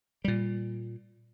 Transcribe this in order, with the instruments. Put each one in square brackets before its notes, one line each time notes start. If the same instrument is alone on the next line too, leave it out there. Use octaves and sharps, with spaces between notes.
[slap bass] A#2 G3